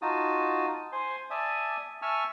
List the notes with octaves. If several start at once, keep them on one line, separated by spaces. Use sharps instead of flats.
D#4 F4 F#4 A5 D#6
C5 G#5 C6
D5 E5 G#5 A5 D#6
E5 G#5 A5 C#6 E6 F6